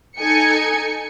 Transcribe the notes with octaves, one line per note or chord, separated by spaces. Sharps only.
D#4 A4 G#5 C#7